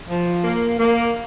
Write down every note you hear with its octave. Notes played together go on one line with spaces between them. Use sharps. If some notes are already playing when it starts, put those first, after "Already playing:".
F3
A#3
A#3